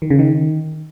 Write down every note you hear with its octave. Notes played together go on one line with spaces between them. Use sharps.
D#3
C#3
D#3